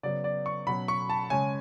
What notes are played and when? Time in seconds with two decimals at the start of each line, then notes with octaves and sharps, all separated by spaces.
0.03 C#3 F#3 B3 D5
0.24 D5
0.46 C#6
0.67 B2 F#3 C#4 B5
0.88 C#6
1.09 A5
1.30 C#3 G#3 C#4 G#5